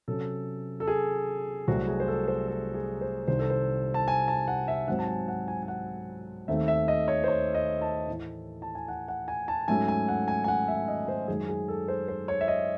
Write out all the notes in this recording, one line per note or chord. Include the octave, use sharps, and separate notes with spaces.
C3 F#3 C#4 A4
A4
G#4
C2 C3 F#3 A3 C4 F#4
G#4
C5
A4
C5
A4
G#4
C5
C2 C3 D#3 C5
A4
C5
A5
G#5
A5
F#5
E5
G#2 F#3 C4 F#5
A5
G#5
F#5
G#5
G#5
F#5
D#2 D#3 A3 C4 E5
E5
D#5
C#5
C5
C#5
D#5
A5
A2 E3 A3
A5
G#5
F#5
F#5
G#5
A5
G#2 F#3 A3 C#4 G#5
G#5
F#5
G#5
G#5
F#5
E5
D#5
C5
F#2 D#3 G#3 G#4
G#4
A4
C5
C5
C#5
E5
D#5